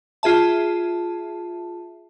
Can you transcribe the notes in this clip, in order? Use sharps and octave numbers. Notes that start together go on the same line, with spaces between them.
F4 G#4 E5 A5